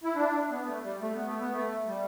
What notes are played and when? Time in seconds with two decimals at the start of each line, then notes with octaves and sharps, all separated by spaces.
0.03 E4
0.15 D4
0.50 B3
0.66 A3
0.84 G3
1.01 A3
1.14 B3
1.27 A3
1.40 B3
1.52 A3
1.87 G3